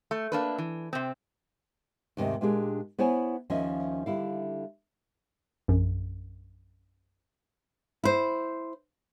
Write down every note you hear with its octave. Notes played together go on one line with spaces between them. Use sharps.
A3
A#3 D4 B4
E3
C3 C4
D#2 G#2 C3 A3 D#5
A#2 G#3 D4 G4 G#4
B3 E4 C5 C#5 F#5 G#5
D#2 F3 C#4 D#5 E5
D3 G3 E4 F5
A#1 F#2
E4 C5